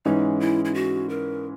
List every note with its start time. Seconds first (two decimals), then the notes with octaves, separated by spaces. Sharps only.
0.05 G#2 E3 G#3 C#4 D#4
0.40 E4
0.65 E4
0.74 F#4
1.09 A#4